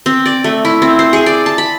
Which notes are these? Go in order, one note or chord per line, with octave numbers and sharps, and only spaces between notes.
C4
D5
A3
E4
C4
C5
G#4
D5
A5
B5